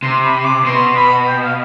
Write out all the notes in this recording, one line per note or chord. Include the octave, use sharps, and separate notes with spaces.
C3 C6
B5
C6
D6
B2 C6
B5
G5
F5